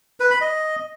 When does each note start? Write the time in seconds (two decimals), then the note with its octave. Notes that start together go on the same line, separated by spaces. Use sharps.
0.20 B4
0.31 B5
0.41 D#5